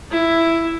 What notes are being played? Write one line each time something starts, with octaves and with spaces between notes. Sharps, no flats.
E4